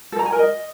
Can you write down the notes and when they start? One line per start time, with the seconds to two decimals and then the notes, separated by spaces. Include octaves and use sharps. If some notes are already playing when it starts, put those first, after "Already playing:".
0.12 A4
0.19 A#5
0.26 G#5
0.32 A#4
0.39 D#5